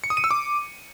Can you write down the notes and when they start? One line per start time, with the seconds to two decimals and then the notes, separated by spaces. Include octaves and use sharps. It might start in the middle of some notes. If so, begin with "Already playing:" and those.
0.04 C#7
0.10 D#6
0.17 D#7
0.24 E6
0.31 D6